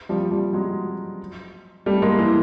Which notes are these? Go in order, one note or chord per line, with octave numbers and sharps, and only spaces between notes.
F3 G3
F3 G3
F#3 G#3
G3 A3
G#3 A#3
E3